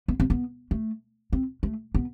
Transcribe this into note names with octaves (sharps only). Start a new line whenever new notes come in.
B3
C4
B3
A3
C4
A3
B3